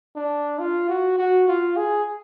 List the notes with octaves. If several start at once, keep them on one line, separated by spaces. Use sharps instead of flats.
D4
F4
F#4
F#4
F4
G#4